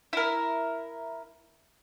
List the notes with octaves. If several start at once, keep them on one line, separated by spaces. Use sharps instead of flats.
E4 A#4